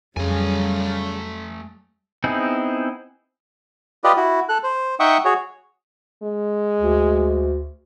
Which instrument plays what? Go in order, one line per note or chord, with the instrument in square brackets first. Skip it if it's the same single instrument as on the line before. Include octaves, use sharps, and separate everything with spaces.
[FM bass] F2 [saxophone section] C#3 [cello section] F#3 G3 [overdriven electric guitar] A3 G#5
[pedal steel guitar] B3 C4 D#4 E4 G#4
[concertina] F4 G4 B4 D5 D#5
E4 F#4
A4 F#6
C5
D#4 E5 F#5 G5 C#6 D#6
F#4 G#4 C#5
[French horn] G#3
[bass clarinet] D2